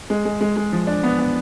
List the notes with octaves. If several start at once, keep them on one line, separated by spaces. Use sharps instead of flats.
G#3
G#3
G#3
G#3
F3
D4
B3
B3